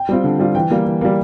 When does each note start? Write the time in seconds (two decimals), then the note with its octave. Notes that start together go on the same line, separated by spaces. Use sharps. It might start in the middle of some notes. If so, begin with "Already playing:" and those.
Already playing: G5
0.09 G3 C4 F4
0.24 D3
0.39 G3 C4 F4
0.55 E3 G5
0.71 G3 A#3
0.86 E3
1.01 G3 A#3